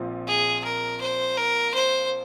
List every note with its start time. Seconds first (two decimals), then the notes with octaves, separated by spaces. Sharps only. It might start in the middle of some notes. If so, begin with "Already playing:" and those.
Already playing: A#1 A#2 F3 C4
0.27 G#4
0.64 A#4
1.01 C5
1.38 A#4
1.75 C5